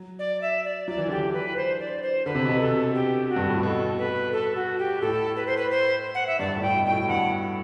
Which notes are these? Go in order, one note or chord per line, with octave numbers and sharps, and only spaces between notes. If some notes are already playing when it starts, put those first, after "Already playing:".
Already playing: F#3
D5
E5
D5
F#3 D5
E3
D3 G4
E3
B4
C5
D5
C5
D3 B4
C3
B2
C3
A4
G4
F#4
G2
A2
B2 A4
B4
A4
F#4
G4
A2 A4
B4
C5
B4
C5
F#5
E5
G2 D5
A2
G5
B2
G5
A2
G2 F#5